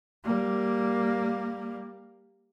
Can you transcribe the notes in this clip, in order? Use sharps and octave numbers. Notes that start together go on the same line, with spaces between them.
G3 A#3